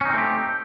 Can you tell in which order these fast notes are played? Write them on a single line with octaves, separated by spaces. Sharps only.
C#4 D#4 C4 A3 G4